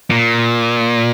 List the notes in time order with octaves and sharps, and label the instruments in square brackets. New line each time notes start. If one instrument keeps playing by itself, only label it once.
[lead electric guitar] A#2